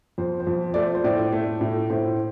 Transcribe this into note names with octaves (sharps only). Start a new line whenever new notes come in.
F2 C5
C5
F2
A3 D5
C5
C5
A2 D5
A3
A2
A2 C5